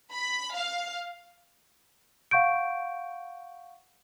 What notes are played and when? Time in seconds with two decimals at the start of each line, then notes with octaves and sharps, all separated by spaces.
0.13 B5
0.56 F5
2.31 F5 F#5 C#6 G6 D7